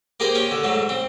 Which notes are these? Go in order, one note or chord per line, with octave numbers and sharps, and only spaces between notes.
A#3 G4 G#4 A#4 C5
C#4 G4 C#5
D3
G#2 F#3 A3
C4